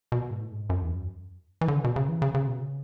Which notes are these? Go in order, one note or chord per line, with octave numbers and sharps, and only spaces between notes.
B2
G#2
A2
G#2
F#2
E2
F#2
E3
D3
C#3
B2
C#3
E3
C#3
C#3
B2
C#3